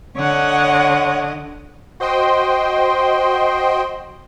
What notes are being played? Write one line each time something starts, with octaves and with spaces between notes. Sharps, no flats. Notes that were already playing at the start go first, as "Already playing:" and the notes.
D3 C#5 D#5 F#5
F#4 C5 D#5 G5 C6